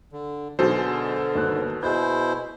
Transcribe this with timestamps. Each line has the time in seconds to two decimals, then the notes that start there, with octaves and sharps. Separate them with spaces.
0.12 D3
0.59 B2 D3 F#3 D#4 G#4 A4 C5
1.35 G1 D#2 F#6
1.83 B2 E4 G#4 C5 G6